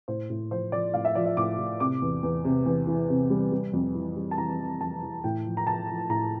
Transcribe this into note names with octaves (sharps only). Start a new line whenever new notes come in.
A2 C5
A2
F3 C5
F3 D5
A2 F5
E5
F3 D5
E5
A2 D6
A2
C3 D6
E2
E2
C3
E2
E3
C3
G3
G3
F2
E3
G3
A5
E3 A#5
E3
F2 A5
E3
A2 G5
F3
A#5
F3 A5
F3
A2 A#5